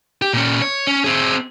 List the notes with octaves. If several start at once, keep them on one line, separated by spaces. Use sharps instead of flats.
G4
A#2 C#4
C#5
C#4
C4 G#4